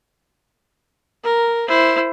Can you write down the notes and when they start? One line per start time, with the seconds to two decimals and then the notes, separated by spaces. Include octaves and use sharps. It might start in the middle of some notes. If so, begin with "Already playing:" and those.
1.23 A#4
1.68 E4 C5